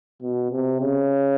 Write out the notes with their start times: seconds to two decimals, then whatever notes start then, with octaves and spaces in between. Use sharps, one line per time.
0.22 B2
0.51 C3
0.80 C#3